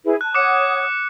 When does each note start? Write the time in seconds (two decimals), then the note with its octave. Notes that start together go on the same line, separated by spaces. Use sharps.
0.05 E4 G#4 B4
0.21 A5 F#6
0.35 C#5 F#5 D6 D#6 F#6 C#7